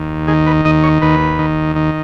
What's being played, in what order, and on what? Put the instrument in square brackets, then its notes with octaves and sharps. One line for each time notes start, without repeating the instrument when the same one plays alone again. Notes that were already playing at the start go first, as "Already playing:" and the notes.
Already playing: [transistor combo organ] D#2
D#3 G#4
B4
D#2 D#5
C#5
D#2 B4
D#3
D#3